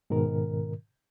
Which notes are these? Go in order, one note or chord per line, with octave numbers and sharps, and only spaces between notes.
G#2 B2 D#3 A#4